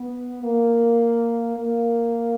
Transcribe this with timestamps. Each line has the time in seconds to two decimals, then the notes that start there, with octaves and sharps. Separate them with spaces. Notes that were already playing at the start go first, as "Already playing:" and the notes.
Already playing: B3
0.43 A#3
1.57 A#3